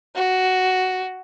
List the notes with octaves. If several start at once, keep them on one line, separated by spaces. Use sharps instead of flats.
F#4